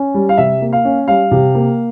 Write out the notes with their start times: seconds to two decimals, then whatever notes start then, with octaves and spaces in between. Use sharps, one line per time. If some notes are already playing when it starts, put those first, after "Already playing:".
Already playing: C#4
0.14 G3
0.29 F5
0.37 C3 E5
0.61 A#3
0.73 F5
0.85 C#4
1.08 G3 F5
1.31 C3
1.55 A#3